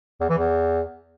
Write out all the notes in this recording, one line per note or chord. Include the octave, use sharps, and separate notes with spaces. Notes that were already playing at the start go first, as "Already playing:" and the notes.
E2
E3
E2